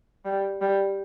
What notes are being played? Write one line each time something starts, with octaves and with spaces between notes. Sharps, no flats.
G3
G3